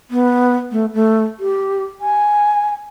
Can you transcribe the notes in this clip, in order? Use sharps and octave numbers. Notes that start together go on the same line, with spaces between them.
B3
A3
A3
G4
G#5